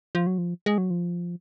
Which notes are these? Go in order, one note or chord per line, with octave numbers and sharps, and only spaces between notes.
F3
F#3
F3
G#3
F#3
F3